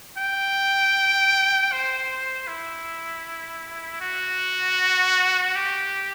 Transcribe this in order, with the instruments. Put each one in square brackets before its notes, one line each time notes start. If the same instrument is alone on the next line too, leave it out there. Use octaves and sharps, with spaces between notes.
[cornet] G5
C5
E4
F#4
G4